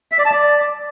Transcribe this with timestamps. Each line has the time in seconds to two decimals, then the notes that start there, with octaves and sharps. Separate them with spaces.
0.12 E5
0.18 D5
0.25 A5
0.32 D5